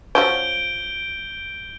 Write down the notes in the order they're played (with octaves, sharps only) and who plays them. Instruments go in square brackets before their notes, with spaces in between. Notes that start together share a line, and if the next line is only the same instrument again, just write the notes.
[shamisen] F3 F#3 C#4 [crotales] G6 D7 G7